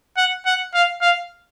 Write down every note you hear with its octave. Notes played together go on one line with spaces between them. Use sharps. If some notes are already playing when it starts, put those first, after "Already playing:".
F#5
F#5
F5
F5